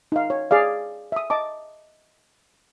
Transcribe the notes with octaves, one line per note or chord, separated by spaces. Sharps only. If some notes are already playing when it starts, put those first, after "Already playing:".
D#4 F5
C#5
G#4 D5 F5
E5 D#6
D#5 A5 D6